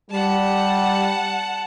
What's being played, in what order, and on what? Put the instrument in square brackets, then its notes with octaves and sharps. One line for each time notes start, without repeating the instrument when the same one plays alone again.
[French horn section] G3 [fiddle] F#5 A5